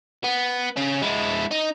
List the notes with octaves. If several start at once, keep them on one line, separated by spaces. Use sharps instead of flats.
B3
C#3 C#4
G#3 E4
D#4